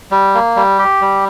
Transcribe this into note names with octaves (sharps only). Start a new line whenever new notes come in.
G3
A#3
G3
G4
G3